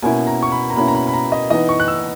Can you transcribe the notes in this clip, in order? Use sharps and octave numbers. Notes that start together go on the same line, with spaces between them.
B2 A#3 C#4 E4 G#5
A#5
C#6
B5
A#5
B2 A#3 C#4 E4 B5
A#5
B5
B5
A#5
D#5
E3 B3 D#4 D#5
C#6
F#6
E6